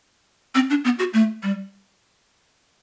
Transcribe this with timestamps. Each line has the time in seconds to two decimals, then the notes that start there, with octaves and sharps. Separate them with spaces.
0.55 C4
0.70 D4
0.84 B3
0.99 F#4
1.13 A3
1.43 G3